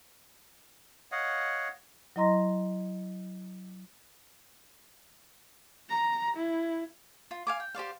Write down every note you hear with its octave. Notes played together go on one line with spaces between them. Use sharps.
C#5 D#5 F5 F#5
F#3 E4 D#5 A#5 C6 A#6
A#5
E4
F4
F5 G#5 D6
G5
G4 C5 D5 F5